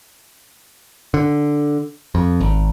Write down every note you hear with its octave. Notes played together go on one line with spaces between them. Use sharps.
D3
F2
G#1